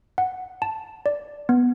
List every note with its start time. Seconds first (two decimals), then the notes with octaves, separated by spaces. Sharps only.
0.18 F#5
0.62 A5
1.06 D5
1.49 B3